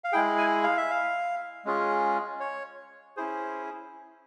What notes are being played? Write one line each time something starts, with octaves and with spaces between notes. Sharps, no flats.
F5
G#3 E4 G#4 G5
G#5
F5
E5
F5
G#3 C#4 F4 G#4
C#5
C#4 E4 G#4 C5